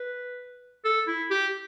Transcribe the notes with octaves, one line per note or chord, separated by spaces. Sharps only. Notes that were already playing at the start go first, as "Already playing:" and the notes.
Already playing: B4
A4
E4
G4